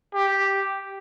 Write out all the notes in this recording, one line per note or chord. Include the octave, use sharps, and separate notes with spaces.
G4